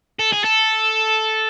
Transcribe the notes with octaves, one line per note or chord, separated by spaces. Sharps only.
A4
G#4
A4